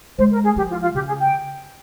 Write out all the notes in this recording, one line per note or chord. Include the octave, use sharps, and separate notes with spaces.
G#3 C5
A#4
G#4
F3 G4
F4
F4
C#3 G4
G#4
G5